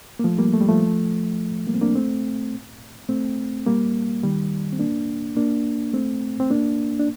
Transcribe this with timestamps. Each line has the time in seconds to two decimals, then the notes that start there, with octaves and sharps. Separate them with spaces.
0.19 A#3
0.24 F3 A3
0.38 G3 A#3
0.53 A3
0.61 G3
0.69 F3 A3
1.67 G3 A#3
1.74 C4
1.81 A#3 D4
1.95 A3 C4
3.09 A3 C4
3.67 G3 A#3
4.23 D#3 G3
4.73 C4
4.79 A#3 D4
5.36 A#3 D4
5.94 A3 C4
6.40 C4
6.50 A#3 D4
6.99 D4